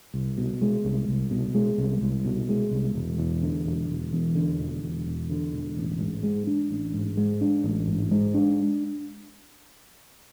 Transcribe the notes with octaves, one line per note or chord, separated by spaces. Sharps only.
C2
B2
G#3
C2
C2
B2
G#3
C2
C2
B2
G#3
C2
E1
E2
D3
E1
E1
E2
D3
E1
E1
E2
D3
E1
A1
G#2
G#3
D4
A1
G#2
G#3
D4
A1
G#2
G#3
D4